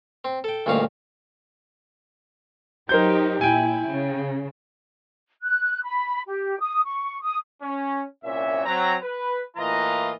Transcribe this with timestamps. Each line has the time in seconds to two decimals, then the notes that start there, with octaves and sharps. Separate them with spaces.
0.25 C4
0.44 A4 G5
0.66 D2 G2 A#2 C#4 D#4 F5
2.89 F#3 D#4 G4 A#4 C5 G6
3.41 A#2 E4 G5 G#5
3.87 C#3
5.42 F#6
5.84 B5
6.27 G4
6.60 D#6
6.85 C#6
7.22 D#6
7.62 C#4
8.24 C2 A#2 C#4 E5
8.65 F#3 C4 A#5
9.02 B4
9.57 A2 E3 A#3 F4 D#5 A#5